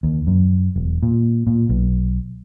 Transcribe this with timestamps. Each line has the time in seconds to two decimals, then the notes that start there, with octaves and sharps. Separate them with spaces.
0.03 D#2
0.27 F#2
0.76 E1
1.03 A#2
1.47 A#2
1.69 B1